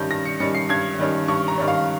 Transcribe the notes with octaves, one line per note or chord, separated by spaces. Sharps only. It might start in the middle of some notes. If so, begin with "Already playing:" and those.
Already playing: G2 D#3 G3 C#4 G6
G2 A#6
C#7
D#3 G3 C#4 C#7
C7
G2 G#6
D#3 G3 C#4
G2 C#6
A#5
D#3 G3 C#4
F5